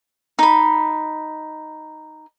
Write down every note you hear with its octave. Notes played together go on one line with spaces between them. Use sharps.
D#4 B5